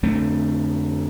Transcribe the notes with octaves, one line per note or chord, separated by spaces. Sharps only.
F2 D3 A3 C4